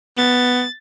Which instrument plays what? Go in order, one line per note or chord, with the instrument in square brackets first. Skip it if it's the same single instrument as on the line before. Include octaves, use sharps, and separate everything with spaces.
[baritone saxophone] B3 [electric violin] A6